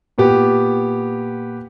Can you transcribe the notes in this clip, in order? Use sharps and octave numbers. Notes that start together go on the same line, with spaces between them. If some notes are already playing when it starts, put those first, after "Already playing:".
A#2 B3 G4